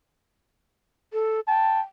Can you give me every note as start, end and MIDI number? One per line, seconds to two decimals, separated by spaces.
1.13 1.40 69
1.48 1.80 79
1.48 1.81 81